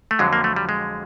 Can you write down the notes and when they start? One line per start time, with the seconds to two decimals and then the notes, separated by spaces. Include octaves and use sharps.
0.11 A3
0.19 F2 D3 F#3 G#3
0.33 A#3
0.44 A3
0.56 G3
0.69 G#3